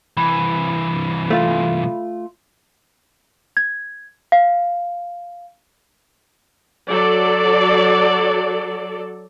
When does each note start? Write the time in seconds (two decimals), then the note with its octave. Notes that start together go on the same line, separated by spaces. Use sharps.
0.17 C2 E3 B5
1.30 A3 F4
3.57 G#6
4.32 F5
6.87 F#3 A4 D5